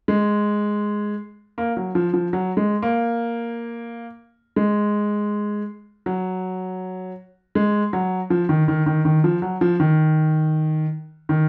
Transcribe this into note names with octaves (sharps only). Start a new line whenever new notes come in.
G#3
A#3
F#3
F3
F3
F#3
G#3
A#3
G#3
F#3
G#3
F#3
F3
D#3
D#3
D#3
D#3
F3
F#3
F3
D#3
D#3